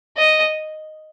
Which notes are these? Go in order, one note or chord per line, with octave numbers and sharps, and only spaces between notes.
D#5